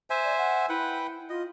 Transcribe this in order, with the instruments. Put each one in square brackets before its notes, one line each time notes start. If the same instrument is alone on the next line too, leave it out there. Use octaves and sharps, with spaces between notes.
[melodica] C5 E5 G#5
[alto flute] D5
F#5
[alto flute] E4 [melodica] B4 F#5 G5
[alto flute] F4 [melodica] D#5